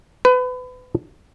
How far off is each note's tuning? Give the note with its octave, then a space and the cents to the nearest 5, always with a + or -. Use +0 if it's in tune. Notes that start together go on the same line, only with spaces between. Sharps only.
B4 +30